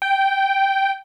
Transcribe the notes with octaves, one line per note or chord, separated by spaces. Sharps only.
G5